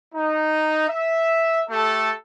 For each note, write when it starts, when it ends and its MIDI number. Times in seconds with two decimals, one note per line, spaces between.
0.14 0.88 63
0.89 1.61 76
1.70 2.12 57
1.70 2.12 67
1.70 2.12 69